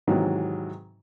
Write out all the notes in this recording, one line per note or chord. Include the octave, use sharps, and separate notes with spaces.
G#2 C3 D#3 E3 F#3